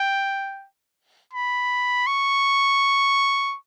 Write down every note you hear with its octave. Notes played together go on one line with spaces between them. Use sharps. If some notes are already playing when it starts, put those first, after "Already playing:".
Already playing: G5
B5
C#6